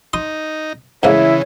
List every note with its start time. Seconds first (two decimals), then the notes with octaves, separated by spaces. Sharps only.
0.13 D#4 C6 D#6
1.03 G#2 C#3 E3 A3 A#3 E4 C#5